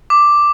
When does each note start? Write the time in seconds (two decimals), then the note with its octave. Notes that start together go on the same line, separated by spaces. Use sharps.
0.10 D6